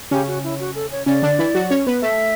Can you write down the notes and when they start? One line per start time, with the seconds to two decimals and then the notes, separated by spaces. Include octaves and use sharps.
0.11 C#3 C#4 G4
0.28 F#4
0.44 E4
0.60 F#4
0.75 A4
0.92 C#5
1.06 C#3 C#4 D5
1.23 D3 D4
1.39 E3 E4
1.55 F#3 F#4
1.70 C#4 C#5
1.87 B3 B4
2.02 A3 A4 E5